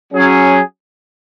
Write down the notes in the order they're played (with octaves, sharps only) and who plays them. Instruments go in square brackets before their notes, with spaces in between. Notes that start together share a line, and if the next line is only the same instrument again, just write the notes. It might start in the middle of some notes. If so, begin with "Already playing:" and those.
[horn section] F#3 C#4 G#4